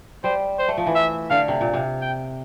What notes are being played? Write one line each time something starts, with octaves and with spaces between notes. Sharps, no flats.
G3 C5
C5
A3
F3
E3
E5
D3 F5
C3
A#2
C3
G5